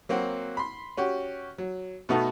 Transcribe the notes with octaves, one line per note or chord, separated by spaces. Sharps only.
F#3 A#3 C4 F#4
B5 C6
C#4 F#4 G4
F#3
B2 A3 B3 D#4 F#4 A4